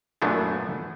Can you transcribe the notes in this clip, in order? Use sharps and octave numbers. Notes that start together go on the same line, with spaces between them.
F#2 A#2 A3 B3 D4 E4